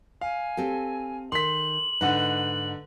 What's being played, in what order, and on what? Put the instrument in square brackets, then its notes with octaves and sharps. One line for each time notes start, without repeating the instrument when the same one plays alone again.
[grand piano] F5 [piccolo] G#5
[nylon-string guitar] C4 G4 A4
[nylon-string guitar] D#3 [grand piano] C6 B6 [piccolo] F#7
[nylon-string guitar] G#2 D#4 F#5 [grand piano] D3 B4